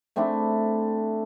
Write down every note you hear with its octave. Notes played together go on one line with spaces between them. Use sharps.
A3 C4 D4 E4